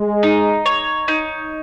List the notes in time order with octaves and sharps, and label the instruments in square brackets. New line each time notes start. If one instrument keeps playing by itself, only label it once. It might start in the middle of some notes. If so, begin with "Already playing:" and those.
Already playing: [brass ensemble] G#3
[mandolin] D#4
C#5
D#4